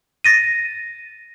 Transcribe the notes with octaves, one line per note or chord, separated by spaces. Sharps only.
A6 A#6 D#7